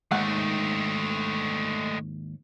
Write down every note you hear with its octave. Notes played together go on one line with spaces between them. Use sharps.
D#2 G#2 D#3 A3 F#5